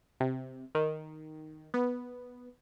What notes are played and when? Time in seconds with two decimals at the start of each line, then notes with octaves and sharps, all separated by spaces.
0.20 C3
0.75 D#3
1.74 B3